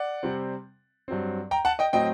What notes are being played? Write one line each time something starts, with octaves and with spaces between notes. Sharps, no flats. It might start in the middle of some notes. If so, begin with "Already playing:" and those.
Already playing: D5 F#5
C3 G3 C4
G2 F#3 C4
G5 A#5
F#5 A5
D#5 G5
A2 F#3 C4 D#5 G5